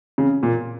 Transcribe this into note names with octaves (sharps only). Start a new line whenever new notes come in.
C#3
A#2